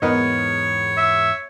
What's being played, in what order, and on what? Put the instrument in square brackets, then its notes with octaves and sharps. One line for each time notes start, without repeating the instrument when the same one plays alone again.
[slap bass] E2 G#2 [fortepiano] B3 A#4 D#5 [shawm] C#5
[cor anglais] E5